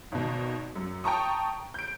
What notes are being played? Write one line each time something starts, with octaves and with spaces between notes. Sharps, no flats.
G#1 B2
F#2
G5 A5 A#5 C#6 D#6
G6 D7